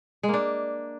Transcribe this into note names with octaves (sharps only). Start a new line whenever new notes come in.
G#3
A#3
D4